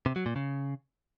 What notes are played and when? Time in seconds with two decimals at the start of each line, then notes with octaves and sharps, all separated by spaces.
0.06 C3
0.16 F#3
0.26 A#2
0.36 C#3